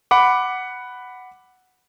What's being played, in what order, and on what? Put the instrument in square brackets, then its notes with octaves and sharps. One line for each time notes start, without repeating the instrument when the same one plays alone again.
[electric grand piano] F#5 B5 D6